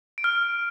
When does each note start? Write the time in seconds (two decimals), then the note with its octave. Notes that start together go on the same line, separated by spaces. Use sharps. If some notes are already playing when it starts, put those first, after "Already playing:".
0.18 D7
0.24 F6
0.31 D7